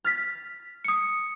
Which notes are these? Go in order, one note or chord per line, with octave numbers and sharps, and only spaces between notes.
F6 A6 B6
D#6 C#7